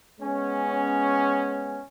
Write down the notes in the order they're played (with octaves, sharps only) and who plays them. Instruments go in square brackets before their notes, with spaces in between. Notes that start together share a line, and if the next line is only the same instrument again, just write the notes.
[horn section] G#3 B3 C#4